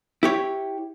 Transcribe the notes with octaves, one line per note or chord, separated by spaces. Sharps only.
E4 G4 C#5